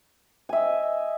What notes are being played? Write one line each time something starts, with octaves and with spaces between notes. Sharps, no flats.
D#5 E5 G#5